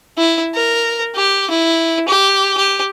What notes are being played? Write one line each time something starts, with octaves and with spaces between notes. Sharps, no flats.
E4
A#4
G4
E4
G4
G4